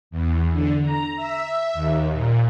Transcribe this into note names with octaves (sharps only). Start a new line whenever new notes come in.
E2
D3
A#5
E5
D#2
A#2